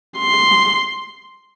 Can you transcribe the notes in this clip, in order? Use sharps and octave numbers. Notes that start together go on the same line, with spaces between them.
C6